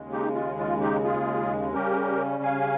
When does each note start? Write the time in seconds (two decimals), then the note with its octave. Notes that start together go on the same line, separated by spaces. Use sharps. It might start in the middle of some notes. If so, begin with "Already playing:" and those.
Already playing: D#2 C#3 G#3
0.12 D#4 G4
0.35 F4
0.59 F4
0.81 D#4 G4
1.04 F4 G#4
1.74 C#3 G3 C#4 G4 A#4
2.43 F5 G#5